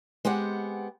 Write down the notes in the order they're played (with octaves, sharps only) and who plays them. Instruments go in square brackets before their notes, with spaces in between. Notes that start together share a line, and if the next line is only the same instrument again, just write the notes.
[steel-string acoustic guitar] G#3 B3 C4 G4 F#5